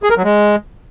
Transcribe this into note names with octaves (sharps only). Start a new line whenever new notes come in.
G#4
A#4
F#3
G#3